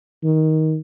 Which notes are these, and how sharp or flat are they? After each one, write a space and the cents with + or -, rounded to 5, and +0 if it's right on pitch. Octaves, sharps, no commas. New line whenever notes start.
D#3 +15